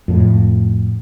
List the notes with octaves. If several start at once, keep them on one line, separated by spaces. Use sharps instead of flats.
F2 A2